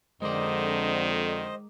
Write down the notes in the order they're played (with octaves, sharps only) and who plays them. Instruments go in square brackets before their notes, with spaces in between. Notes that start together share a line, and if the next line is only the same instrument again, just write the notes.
[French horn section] F2 D3 [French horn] D#3 [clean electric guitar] G#3 A#4 D5 [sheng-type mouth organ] C5 D#5